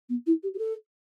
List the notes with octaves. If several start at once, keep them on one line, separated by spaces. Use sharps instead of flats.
B3
E4
G4
G4
A4